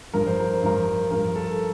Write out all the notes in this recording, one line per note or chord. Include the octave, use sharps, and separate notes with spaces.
G2 F3 A#4
C5
A#4
C5
G2 F3 A#4
G2 F3 A#4
A4